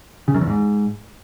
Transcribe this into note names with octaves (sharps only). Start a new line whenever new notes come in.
C#3
F#2
E2
G#2